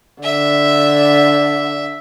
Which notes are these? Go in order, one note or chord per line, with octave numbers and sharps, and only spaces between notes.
D3 E5